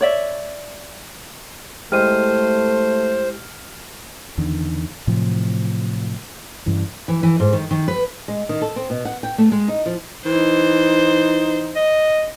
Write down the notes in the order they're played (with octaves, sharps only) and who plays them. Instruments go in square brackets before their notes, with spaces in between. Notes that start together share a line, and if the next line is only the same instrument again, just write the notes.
[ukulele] C#5 D5 E5
[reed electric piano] G#3 E4 G4 [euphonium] A3 [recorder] C5 [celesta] F6 D#7
[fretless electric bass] E2 D3 D#3
A2 C3 F3 F#3
G2 C#3 E3
[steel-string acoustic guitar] E3
E3
G#2
D#3
D#3
B4
[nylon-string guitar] G#3
D#3
A4
C4
B2
F#5
G5
A3
G#3
D#4
F3
[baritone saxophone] E3 [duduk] D#4 [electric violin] C5
[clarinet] D#5